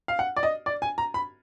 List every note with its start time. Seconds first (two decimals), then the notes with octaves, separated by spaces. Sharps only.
0.08 F5
0.19 F#5
0.37 D5
0.43 D#5
0.66 D5
0.82 G#5
0.98 A#5
1.14 B5